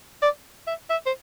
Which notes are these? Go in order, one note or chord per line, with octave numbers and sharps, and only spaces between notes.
D5
E5
E5
C5